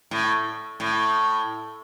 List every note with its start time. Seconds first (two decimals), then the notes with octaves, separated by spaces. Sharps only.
0.11 A2
0.80 A2